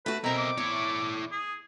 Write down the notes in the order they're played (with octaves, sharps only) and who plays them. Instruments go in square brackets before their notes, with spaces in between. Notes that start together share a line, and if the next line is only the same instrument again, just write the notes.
[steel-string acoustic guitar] A3 F#4 [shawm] B4
[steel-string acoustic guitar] B2 C4 [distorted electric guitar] E4 A#4 [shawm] A#5
[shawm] D6
[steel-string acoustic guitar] E2 [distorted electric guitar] E4 C#5
[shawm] G#4